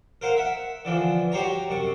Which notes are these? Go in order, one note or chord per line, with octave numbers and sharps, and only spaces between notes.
A#4 C5 F5 F#5
E5 F#5
D3 E3 F3
F#4 G4 C5 C#5 A#5
F#2 C3 C#6